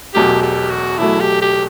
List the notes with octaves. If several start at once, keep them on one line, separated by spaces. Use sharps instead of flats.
E1 E2 B2 F#3 A3 G4
G4
F#4
E1 E2 B2 F#3 A3 E4
G4
G4